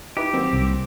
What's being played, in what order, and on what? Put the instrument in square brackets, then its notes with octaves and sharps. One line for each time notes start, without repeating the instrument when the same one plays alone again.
[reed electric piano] D#4 E4 B4 [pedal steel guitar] G4
[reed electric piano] D#3 F#3 A#3 [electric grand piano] C4
[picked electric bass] C2